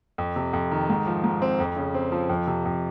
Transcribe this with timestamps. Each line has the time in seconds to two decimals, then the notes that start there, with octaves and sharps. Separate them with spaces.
0.18 F2
0.36 C3
0.53 F2
0.71 D#3
0.90 G#2
1.07 F3
1.24 G#2
1.42 C4
1.60 F2
1.77 C#3
1.94 C4
2.12 F3
2.29 F2
2.47 C3
2.65 F2